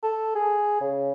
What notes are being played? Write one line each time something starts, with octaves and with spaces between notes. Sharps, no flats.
A4
G#4
C#3